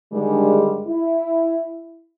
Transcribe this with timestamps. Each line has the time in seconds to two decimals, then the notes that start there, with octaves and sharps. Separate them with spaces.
0.11 G2 D3 D#3 G3 G#3
0.86 E4